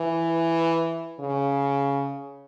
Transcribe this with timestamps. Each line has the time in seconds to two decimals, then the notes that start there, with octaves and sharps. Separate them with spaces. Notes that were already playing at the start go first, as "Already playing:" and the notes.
Already playing: E3
1.20 C#3